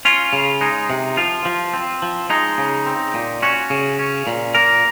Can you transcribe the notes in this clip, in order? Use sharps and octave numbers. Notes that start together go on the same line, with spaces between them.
C#4 F4
C#3
G#3 D#4
C3
F3 F4
F3
C4
F3
G#3 D#4
C#3
C4
A#2
C#4 F#4
C#3
C#4
A#2
A#3 A#4